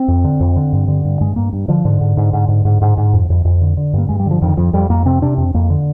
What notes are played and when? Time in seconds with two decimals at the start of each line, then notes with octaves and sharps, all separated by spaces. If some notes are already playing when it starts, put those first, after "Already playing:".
Already playing: C4
0.08 F2
0.24 D3
0.40 F2
0.56 D3
0.73 G2
0.88 D3
1.05 G2
1.21 G2 G#3
1.36 G2 A#3
1.53 G2
1.68 D3 F3
1.85 G#2 D3
2.01 G#2
2.17 G#2
2.33 G#2
2.48 G#2
2.65 G#2
2.82 G#2
2.97 G#2
3.13 F2
3.30 F2
3.45 F2
3.61 D3
3.77 D3
3.93 G2 A#3
4.09 G2 G#3
4.20 G3
4.26 D3 F3
4.42 F2 D#3
4.57 F2 F3
4.73 F2 G3
4.89 F2 A#3
5.05 C3 C4
5.22 C3 D4
5.38 F2 C4
5.54 F2 A#3
5.70 D3